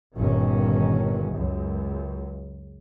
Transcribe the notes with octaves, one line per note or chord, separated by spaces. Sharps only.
G1 A#2 D#3 C#4
C#2 F#2